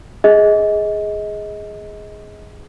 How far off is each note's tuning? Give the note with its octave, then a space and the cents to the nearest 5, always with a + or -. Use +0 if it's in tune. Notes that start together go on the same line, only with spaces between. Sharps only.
G#4 +0 D#5 +25